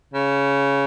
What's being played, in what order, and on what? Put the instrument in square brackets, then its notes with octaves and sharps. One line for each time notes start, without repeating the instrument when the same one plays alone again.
[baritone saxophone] C#3